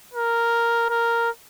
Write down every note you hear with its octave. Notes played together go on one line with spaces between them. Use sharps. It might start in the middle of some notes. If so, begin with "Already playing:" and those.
A#4
A#4